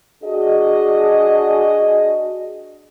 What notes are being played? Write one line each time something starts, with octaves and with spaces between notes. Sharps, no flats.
D4 F#4 G#4 D#5